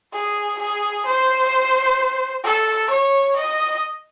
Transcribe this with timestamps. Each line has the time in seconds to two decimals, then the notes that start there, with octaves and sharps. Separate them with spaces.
0.13 G#4
0.59 G#4
1.06 C5
2.44 A4
2.90 C#5
3.36 D#5